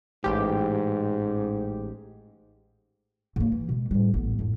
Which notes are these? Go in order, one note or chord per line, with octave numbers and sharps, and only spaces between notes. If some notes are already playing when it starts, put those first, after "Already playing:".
A1 G#2 G4
G#2 A#3
E3
B2 G#3
A2 G3
A1 B3
F2 A2